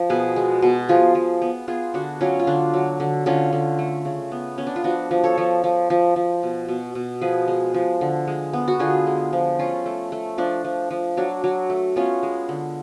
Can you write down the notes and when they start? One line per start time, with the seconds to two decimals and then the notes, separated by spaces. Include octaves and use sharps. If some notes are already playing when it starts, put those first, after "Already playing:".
Already playing: F3
0.10 B2 G#4 B4
0.36 G#3
0.62 B2
0.89 F3 F4 G#4
1.15 F3
1.42 B3
1.68 B3 F4 G#4
1.94 D3 D4 F#4
2.21 F#3 C#4 F4
2.39 F4
2.47 D3 D4
2.74 F#3
3.00 D3
3.26 D3 C#4 F4
3.53 D3
3.79 A3
4.05 C#3
4.32 B3
4.58 B3 C#4
4.67 D4
4.76 F4
4.84 F3 D4 F#4
5.11 F3
5.24 A4 C#5
5.38 F3
5.64 F3
5.90 F3
6.16 F3
6.43 B2
6.68 B2
6.95 B2
7.21 F3 G#4 B4
7.48 G#3
7.74 F3
8.01 D3
8.27 G#3
8.53 B3
8.68 F#4
8.79 D3 F4 G#4
9.07 G#3
9.33 F3
9.59 A3 C#4 F4
9.86 A3
10.12 A3
10.38 F3 D4
10.64 F3
10.91 F3
11.17 F#3 D4
11.44 F#3
11.70 A3
11.96 B3 C#4 F4
12.23 G#3
12.49 D3